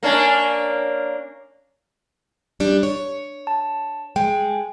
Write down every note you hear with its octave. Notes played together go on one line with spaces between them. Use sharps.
A#3 C#4 D4
G3 D4
C#5
A5
G#3 G5